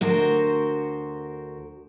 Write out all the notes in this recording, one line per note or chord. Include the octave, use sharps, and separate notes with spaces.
D2 F#4 A#4 C5